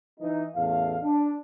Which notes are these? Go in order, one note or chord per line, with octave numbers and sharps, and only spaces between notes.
E3 D#4
A1 E2 A3 F5
D4